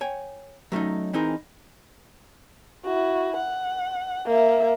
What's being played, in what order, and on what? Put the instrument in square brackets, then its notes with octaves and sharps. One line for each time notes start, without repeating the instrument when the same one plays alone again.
[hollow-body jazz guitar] C#5 G5 G#5
F#3 A3 C#4 D#4
E3 C4 D#4 G#4 A#4
[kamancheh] E4 F#4
F#5
A#3 E5